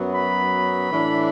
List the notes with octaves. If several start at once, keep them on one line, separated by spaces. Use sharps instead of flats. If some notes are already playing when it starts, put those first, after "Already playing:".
Already playing: F#2 F#3 B3
B5
A2 E3 D4